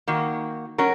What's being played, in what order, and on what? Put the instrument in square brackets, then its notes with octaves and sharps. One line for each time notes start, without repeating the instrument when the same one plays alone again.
[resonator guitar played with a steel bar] D#3 A#3 F#4
F#3 C#4 F#4 A#4